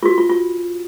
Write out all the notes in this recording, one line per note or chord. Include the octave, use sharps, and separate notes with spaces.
F4
F#4
F4
F4